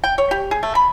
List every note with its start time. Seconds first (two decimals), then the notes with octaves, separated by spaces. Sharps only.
0.04 G5
0.18 C#5
0.31 G4
0.51 G#4
0.63 A3
0.75 B5